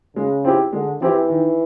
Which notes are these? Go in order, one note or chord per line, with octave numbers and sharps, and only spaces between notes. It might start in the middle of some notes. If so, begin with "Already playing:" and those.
C#3 G#3
C4 E4 G4
D3 G#3
E3 C4 E4 G4
D#3